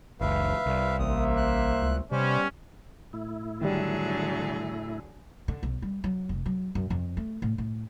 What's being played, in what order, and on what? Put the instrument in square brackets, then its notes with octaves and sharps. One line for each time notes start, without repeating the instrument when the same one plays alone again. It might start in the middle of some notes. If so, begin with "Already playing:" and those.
[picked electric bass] F#1 C#2 [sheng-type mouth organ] B4 E5 F5
[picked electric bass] C2
[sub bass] A1 [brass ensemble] A#3 C5 E5 [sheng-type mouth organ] D#6
[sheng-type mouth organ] F#6
[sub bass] C#2
[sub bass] C3 [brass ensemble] G3 B3 C#4 [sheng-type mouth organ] C5 D5
[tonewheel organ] A2 E4
[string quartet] D3 F#3 G#4 [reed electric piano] D#3 G3
[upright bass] D3
B1
G3
F#3
F1
F#3
F#2
F2
A3
A2
A2